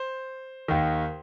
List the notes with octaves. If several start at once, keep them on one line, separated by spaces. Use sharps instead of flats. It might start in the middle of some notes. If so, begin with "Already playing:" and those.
Already playing: C5
D#2 D#3